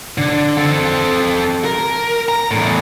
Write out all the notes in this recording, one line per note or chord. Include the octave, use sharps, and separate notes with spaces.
D3
C4 A4
A#4
A#5
E2 A2